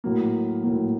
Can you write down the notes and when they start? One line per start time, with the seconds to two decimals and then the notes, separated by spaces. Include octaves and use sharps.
0.04 A2 F#3 A#3
0.63 A2 F#3 A#3